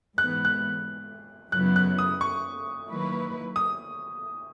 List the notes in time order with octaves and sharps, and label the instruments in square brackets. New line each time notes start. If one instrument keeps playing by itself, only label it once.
[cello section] G#2 E3 G#3 B3 [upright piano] F#6
[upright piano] F#6
[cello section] F#2 C#3 F#3 B3 E4 [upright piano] F#6
[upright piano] F#6
D#6
C#6
[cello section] D#3 F#3 A#3 E4 B4
[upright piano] D#6